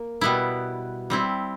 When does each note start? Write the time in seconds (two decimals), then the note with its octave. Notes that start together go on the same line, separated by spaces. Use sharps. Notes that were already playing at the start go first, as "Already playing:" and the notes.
Already playing: A#3
0.21 B2 G3 B3 E4
1.10 G3 C4 E4